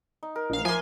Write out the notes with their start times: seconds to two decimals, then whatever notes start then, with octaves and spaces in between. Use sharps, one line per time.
0.23 D#4
0.36 A#4
0.50 A#1 F5
0.65 F3 A#4 E5 G#5 C6 D6